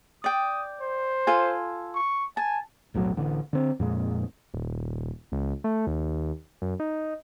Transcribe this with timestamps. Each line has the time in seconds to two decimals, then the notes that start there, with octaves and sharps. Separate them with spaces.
0.24 D5 G5 D#6
0.81 C5
1.27 F4 A4 G#5
1.95 C#6
2.37 G#5 A5
2.94 E1 B1 A2 F#3
3.17 A1 D3
3.53 D3 C4
3.79 F2 A#2 G#3
4.54 D#1
5.32 C#2
5.64 A3
5.87 D#2
6.62 F#2
6.80 D#4